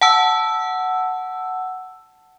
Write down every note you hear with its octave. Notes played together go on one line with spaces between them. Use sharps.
F#5 A5 E6